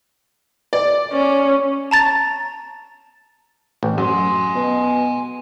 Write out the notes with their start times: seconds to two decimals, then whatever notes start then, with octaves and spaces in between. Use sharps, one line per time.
0.73 D5
1.13 C#4
1.91 A5 A#5 A6
3.83 A1
3.98 F#2 G#5 C6
4.55 B2